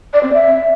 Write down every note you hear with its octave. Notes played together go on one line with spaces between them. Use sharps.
D5
C4
E5